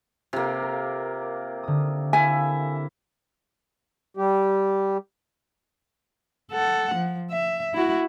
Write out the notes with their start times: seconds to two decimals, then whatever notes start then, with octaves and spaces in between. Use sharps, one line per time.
0.33 C3 A#3 F4 A4
0.62 A#4
1.63 D3 D#6
2.13 E4 A4 E5 F5 G#5
4.17 G3 G4
6.52 A4 F#5
6.95 F3
7.31 E5
7.74 E4 F#4